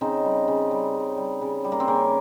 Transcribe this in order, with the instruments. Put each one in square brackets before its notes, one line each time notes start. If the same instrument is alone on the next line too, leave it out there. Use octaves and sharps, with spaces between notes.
[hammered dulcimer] C#3 C4 D#4
G3
C#3
G3
C#3
G3
C#3
G3
A#3
C4
C#3 A#3 C#4